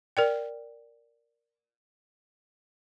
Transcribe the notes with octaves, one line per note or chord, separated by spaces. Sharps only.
A#4 D5 G5